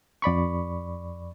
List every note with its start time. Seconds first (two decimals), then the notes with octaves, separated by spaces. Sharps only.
0.22 F2 D5 B5 C#6